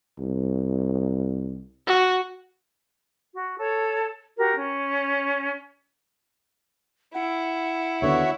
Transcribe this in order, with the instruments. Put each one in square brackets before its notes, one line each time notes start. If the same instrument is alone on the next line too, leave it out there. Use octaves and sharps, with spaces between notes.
[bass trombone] C2
[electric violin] F#4
[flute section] F#4
A4 C#5
F#4 G4 A#4
C#4
[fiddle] E4 [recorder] F#5
[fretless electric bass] D#2 D3 B3 [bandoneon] F#4 C#5 E5